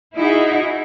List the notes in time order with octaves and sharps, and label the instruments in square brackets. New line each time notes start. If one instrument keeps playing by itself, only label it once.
[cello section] D#4 E4 F#4 G#4